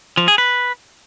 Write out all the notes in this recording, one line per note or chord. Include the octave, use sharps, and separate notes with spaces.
F3
G#4
B4